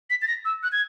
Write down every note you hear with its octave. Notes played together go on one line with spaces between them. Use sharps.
B6
A6
A#6
E6
F#6
G#6